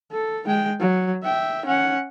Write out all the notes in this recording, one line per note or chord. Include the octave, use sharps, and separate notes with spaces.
A4
G#3 G5
F#3
E5 G5
C#4 F#5